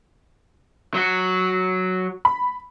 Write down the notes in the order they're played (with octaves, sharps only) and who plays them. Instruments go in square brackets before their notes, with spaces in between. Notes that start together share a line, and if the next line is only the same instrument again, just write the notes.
[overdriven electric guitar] F#3 F#4
[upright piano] B5